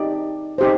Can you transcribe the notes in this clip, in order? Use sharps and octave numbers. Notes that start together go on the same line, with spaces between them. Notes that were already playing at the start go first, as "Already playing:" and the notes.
Already playing: D#4 G4 D5
D#4 G4 C5